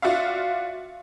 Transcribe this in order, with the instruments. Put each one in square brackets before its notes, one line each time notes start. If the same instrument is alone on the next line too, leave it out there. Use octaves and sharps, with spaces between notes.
[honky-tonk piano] F4 F#4 D5 E5 F5